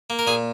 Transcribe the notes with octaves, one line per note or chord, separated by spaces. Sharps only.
A#3
A#4
A#2 G#4